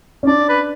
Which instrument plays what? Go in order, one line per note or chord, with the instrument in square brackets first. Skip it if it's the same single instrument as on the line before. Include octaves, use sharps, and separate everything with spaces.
[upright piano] C#4
[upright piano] D4 [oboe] D5
[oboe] B4